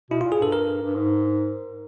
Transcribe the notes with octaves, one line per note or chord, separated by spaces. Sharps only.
B2 E4
F4
A#2
G#4
G2 A4
A#4
G2
G#2